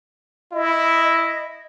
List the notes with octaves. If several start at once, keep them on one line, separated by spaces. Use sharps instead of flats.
E4 D#5